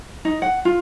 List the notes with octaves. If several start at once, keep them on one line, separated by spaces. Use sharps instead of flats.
D#4
F#5
F4